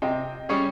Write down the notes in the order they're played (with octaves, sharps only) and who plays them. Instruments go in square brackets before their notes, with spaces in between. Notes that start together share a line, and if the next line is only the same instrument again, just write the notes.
[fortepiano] C3 [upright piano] D#5 G5
[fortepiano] G3 C#4 G#4 C#5